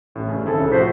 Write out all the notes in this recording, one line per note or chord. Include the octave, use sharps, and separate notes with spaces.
A1 A2
G2 C#3
D#3 C4 E4 G#4 A4
C2 C#3
A2 F3 F#4 C5 B6